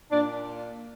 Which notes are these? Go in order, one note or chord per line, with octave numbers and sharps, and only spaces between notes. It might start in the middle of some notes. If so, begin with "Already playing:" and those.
A#2 D4